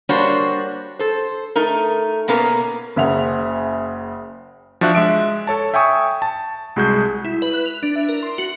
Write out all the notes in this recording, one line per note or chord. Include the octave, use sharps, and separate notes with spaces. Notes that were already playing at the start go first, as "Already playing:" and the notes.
G3 A#3 D4 F#4 C5 C#5
A4 C5
A3 D#4 A#4
B2 A#3 B3 C#4 A#4
F#1 C#3 E5 F#5 F7
F3 D4 F#4 E5 F#6
G#3 E5 D7
A4 C#5 A5
E5 G5 G#5 C#6 D#6
A5
C2 G#3 F#4 G#4 G6
E4
B4
F#6
F7
D4
E5
A#4
C6
F#4